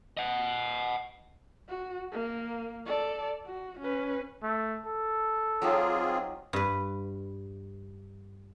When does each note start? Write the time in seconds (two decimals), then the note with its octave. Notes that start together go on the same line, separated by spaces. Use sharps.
0.17 D#5 F#5
1.68 F#4
2.12 A#3
2.86 A4 D5
3.46 F#4
3.80 C#4 B4
4.43 A3
4.86 A4
5.62 F#3 C4 D#4 F4 G4 G#4
6.53 G2 B4